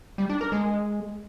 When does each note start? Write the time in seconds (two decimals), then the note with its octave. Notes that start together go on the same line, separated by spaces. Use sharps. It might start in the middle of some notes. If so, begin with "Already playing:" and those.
0.18 G3
0.29 D4
0.41 A#4
0.52 G#3